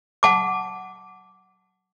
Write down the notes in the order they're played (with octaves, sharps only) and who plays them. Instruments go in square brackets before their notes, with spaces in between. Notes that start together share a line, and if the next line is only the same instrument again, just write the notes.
[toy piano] F#5 A5 D6